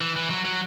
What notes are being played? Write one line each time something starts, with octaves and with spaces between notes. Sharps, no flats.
E3
E3
F#3
F#3